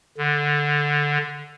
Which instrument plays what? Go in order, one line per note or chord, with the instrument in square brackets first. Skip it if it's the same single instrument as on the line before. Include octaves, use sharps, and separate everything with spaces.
[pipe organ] D3